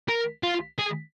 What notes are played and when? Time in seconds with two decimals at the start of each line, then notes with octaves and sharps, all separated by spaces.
0.08 A#4
0.43 F4
0.78 G#4